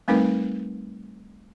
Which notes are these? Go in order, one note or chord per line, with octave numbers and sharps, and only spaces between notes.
G3 A3 C4 D#4 A#4 B4